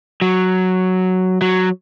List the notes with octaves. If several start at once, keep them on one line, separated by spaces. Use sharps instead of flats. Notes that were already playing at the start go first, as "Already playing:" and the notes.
F#3
F#3